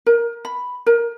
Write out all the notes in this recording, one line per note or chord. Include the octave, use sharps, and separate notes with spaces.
A#4
B5
A#4